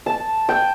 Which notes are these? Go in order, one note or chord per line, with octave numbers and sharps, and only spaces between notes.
A5
G5